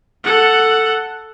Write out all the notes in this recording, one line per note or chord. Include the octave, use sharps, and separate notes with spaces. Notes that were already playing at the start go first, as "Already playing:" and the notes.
A4 F#5